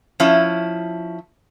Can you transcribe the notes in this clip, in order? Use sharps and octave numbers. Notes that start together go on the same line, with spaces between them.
F3 C#4 E4